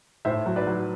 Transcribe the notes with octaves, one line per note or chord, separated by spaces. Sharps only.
A2 C5 E5
F#3
B4 D5
F#3